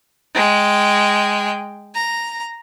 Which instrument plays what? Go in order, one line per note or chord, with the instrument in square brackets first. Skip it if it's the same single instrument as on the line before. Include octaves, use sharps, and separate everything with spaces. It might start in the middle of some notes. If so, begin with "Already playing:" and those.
[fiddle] G#3 G5
A#5